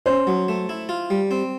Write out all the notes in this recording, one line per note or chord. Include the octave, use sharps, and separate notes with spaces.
C#4 C5
F#3
A3
E4
F4
G3
C4